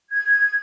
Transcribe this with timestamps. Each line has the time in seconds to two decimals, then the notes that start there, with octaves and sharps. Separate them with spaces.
0.11 G#6